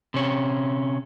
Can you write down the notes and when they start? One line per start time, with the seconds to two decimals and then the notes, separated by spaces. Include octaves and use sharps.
0.14 C3 C#4